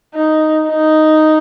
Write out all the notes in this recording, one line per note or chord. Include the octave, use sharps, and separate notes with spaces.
D#4
D#4